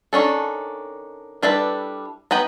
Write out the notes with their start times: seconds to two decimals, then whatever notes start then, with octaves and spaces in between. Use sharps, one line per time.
0.13 D#3 C#4 D4 A4
1.42 G3 D4 E4 A4 B4
2.31 B3 D#4 B4 G5